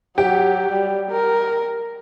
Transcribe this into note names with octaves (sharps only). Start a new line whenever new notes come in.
F#3 G4
G3
A#4